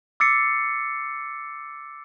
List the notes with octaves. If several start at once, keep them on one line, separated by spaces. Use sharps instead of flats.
D6 E6 A6 C7 C#7